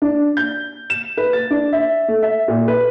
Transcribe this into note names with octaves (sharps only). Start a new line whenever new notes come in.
D4
G6
E7
B4
A6
D4
E5
A3
E5
A#2
B4